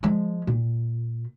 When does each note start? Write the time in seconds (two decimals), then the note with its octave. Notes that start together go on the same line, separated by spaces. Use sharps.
0.03 F3 G#3
0.47 A#2